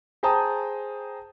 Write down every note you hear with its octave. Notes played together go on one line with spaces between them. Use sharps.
G#4 C5 G5 A5 A#5 D#6